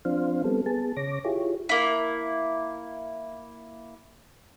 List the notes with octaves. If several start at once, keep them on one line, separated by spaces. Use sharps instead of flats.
F3 C4 D4 C5 F5
G3 B3 C4 A4
B3 G#4 A5
C#3 C#5 D6 A#6
E4 F4 G4 G#4 C#5
A#3 E4